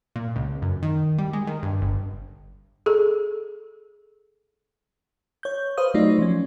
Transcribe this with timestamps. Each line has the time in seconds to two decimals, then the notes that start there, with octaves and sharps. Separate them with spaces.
0.16 A#2
0.36 C#2
0.62 F#2
0.83 D#3
1.18 G3
1.33 G#3
1.47 D#3
1.63 G2
1.82 G1
2.86 G#4 A4
5.43 C#5 G6
5.77 B4 C5 F5 D#6
5.94 F#3 A3 D#4 F4 D5
6.18 F3 C#4